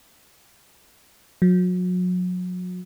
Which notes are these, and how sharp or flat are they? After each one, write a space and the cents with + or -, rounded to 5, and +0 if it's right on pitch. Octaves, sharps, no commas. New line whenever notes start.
F#3 -35